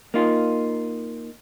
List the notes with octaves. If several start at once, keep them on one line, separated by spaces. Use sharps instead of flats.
A#3 D#4 F4